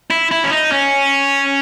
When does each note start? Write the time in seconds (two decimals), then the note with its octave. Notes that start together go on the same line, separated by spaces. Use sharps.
0.11 E4
0.31 E4
0.44 C#4
0.51 D#4
0.72 C#4